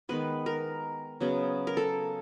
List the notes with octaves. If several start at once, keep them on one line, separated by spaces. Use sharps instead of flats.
D#3 G#3 B3 B4
A#4
C#3 F#3 B3
A#4
A4